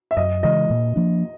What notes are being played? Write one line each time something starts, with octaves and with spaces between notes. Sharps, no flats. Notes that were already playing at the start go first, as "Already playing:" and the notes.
E5
F#2 D#5
C#3 E3 G#3 D#5
A#2
F3 A#3 D4